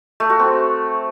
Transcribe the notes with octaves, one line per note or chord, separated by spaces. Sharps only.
A3
F#4
C4